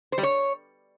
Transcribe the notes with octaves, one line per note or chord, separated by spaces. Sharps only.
C5
G3
C#5